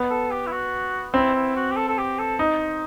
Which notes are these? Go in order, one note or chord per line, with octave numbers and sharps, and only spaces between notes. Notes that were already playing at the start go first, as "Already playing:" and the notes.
Already playing: B3
A4
G4
E4
F#4
C4 E4
E4
F#4
G4
A4
A4
G4
A4
D#4